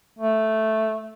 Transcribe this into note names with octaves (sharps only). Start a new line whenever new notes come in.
A3